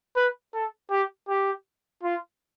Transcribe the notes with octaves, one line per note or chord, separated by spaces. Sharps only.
B4
A4
G4
G4
F4